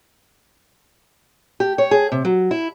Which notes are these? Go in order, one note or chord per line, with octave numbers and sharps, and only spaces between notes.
G4
C#5
G#4
C3
F#3
E4